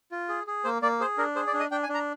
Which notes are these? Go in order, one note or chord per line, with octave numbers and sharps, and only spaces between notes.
F4
G#4
G#4
A#3 C5
A#3 D5
G#4 C5
D4 A#4
G#4 C5
D5
D4
D#5
D4 G5
G#5
D4
A#5